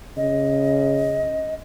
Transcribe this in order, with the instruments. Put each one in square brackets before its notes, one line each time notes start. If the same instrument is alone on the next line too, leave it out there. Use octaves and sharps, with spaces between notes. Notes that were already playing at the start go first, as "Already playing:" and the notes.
[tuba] C#3 [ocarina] D#5